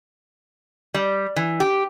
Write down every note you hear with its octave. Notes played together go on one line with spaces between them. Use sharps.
G3
E3
G4